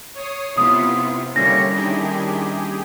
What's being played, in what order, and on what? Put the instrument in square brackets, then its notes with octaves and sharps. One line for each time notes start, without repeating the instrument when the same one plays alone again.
[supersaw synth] C#5 D#6 C7
[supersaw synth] C3 [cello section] B3 E4 F4 [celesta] D#6
[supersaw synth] D3 [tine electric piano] G3 A#3 C#4 [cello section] E4 G4 C#5 [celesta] A#6
[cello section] D#3 D4 E4 [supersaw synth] G4 G#4